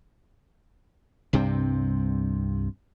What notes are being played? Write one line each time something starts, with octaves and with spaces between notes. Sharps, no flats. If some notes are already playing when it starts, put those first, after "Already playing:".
C2 G2 C3 C4